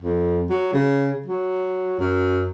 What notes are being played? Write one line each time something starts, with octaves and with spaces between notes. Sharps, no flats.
F2
F#3
C#3
F#3
F#2